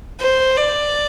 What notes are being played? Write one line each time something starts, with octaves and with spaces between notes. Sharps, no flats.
C5
D5